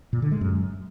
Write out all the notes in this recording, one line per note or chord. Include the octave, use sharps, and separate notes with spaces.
A#2
D3
G#3
F#2